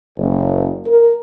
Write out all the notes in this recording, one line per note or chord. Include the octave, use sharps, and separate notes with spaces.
F#1
A#4